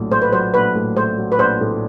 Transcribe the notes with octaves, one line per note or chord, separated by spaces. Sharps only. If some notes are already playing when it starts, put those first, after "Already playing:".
Already playing: A#1 A2 F#3 A3
A3 C5
B4
F#3 C5
A#1 B4
A2
A3 C5
F#3
B4
A#1 C5
A2